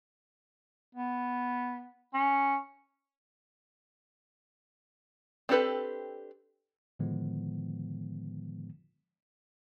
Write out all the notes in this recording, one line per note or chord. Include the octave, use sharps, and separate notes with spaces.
B3
C#4
C4 D4 G4 A4 B4
A2 D3 D#3 F3 G#3 B3